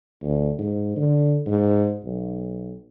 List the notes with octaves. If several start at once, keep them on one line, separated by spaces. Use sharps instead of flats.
D2
G#2
D3
G#2
B1